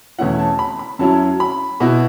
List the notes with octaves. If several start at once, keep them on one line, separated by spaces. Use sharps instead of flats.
E2 B2 A3 C#4 E4 F#5
A5
B5
B5
F#2 F#3 C#4 E4 A5
B5
B2 B3 E4